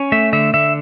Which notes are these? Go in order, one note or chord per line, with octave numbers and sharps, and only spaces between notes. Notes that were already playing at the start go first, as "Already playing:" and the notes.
Already playing: C#4
A3 E5
D3 E5
D3 E5